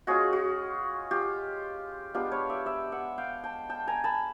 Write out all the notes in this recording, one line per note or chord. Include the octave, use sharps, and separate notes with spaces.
G#3 C#4 F4 F#4 G#4
F#4
F4 G4
G#3 B3 D4 F4 G4
B4 C#5
D5 E5
D5 E5
E5 F#5
F5 G5
G5 A5
G5 A5
G#5 A#5
A5 B5